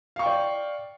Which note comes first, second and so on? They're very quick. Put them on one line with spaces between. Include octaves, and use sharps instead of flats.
F5 C#6 G5 D5